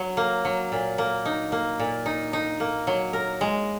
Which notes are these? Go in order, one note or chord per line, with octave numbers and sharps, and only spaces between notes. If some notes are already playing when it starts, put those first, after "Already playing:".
Already playing: F#3
A#3
F#3
A#2
A#3
D#4
A#3
A#2
D#4
D#4
A#3
F#3
A#4
G#3